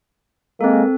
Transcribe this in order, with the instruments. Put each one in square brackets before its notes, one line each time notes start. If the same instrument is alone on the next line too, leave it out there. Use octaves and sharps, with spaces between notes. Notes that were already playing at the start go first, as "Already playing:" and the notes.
[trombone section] G#3 A#3 [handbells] C4 A4